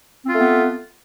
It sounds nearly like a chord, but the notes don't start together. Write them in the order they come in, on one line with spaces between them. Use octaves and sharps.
C4 F4 A3 B3